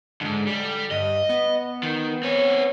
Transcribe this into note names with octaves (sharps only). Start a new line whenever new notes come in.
F2 G#2 D3
G3
G2 D#5
B3
D#3
C4 C#5